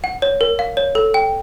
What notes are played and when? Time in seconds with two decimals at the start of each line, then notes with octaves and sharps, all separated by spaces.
0.04 F#5
0.22 C#5
0.41 A#4
0.59 F5
0.77 C#5
0.95 A4
1.14 G5